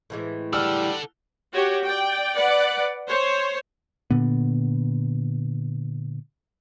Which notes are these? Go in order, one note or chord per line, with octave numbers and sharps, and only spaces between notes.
A2 E3 G#3
G3 A4 F#5 E6 F6
F#4 G4 C#5
D5 G5
B4 D5 F#5
C5 C#5
A#2 D3 B3